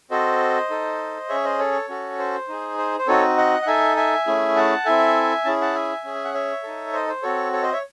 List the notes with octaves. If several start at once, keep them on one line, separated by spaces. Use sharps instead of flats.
C4 F#4 A4 C5 D#5
D#4 A4
C#4 G#4 C#5 E5
C5 D#5
A4 C#5
C#4 F#4 A4
C5
D#4 G#4
C5
C5
C4 D#4 F#4 A4 C#5
D#5 F#5
F#5
D#4 A4 E5 G#5
E5 G#5
A3 C#4 E4 G#4
F#5 A5
C4 E4 A4 E5 G#5
C#4 E4 G#4 A5
F#5 A5
E5 G#5
C#4 G#4
G#5
F#5
C#5 E5
D#4 A4
C5 D#5
C5
C4 F#4 A4 C#5
A4 C#5
C5 D#5
C#5 E5